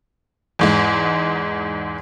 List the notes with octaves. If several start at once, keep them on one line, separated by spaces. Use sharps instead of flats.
E2 G#2 G#3